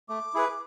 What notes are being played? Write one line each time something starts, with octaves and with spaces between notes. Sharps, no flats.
A3 D6
E4 G#4 B4